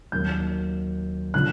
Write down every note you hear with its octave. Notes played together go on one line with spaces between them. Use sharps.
D#2 D#3 F#3 A#3 G6
D3 F3 F#6